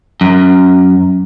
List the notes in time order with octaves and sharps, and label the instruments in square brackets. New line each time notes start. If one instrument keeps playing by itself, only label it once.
[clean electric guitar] F#2